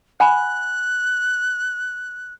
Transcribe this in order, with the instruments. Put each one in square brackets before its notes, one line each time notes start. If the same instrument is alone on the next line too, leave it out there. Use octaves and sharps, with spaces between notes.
[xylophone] F#5 G#5 B5 [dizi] F#6